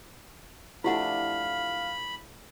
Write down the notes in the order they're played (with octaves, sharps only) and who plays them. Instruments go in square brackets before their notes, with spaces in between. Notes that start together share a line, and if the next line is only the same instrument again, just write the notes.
[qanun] F3 A3 D4 [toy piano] E4 G4 F#5 [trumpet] F5 [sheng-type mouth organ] B5